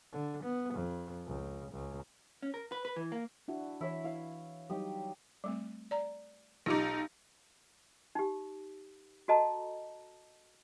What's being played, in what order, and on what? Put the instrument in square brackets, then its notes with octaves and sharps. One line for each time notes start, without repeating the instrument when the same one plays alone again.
[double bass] D3
B3
F2
C#2
C#2
[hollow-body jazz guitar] C#4
A#4
B4
B4
E3
A#3
[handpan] D4 E4 F#4
[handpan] E3 [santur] E4 C#5 E5
[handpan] E4 [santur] F5
[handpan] F#3 G3 D#4 [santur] G4 D#6
[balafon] G3 A3 C4
D5 A#5
[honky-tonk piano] B1 D#4 [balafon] F4 G4 D6
[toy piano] D#4 G4
F#4 A4 D#5 A5 A#5